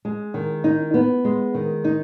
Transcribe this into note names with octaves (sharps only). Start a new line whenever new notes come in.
G#3
D#3
D#4
B3
G#3
D#3
D#4